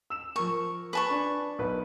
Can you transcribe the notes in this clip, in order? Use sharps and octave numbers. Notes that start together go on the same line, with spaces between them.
E6 E7
F3 A#4 C#6
B4 A5 C#6
D4 G#5
B1 B4